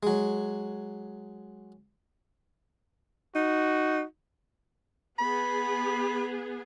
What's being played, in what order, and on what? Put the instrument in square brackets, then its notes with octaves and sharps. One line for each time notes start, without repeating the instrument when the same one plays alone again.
[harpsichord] F#3 G#3
[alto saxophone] D#4 [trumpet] F#4
[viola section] B3 G#4 [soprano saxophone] B5